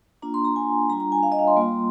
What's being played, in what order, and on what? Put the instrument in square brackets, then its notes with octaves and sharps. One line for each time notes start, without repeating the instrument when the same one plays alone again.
[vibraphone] A#3 D4 F4 A#5
C6
A#5
G#5
G3 D4 F4 A#5
A#5
G#5
F5
D#5
F5
C6
G3 A#3 F4